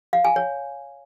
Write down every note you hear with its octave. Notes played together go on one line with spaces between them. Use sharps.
F5
G#5
C#5